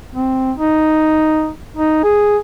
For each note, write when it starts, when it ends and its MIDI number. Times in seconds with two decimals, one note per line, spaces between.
0.15 0.52 60
0.57 1.51 63
1.77 2.02 63
2.04 2.37 68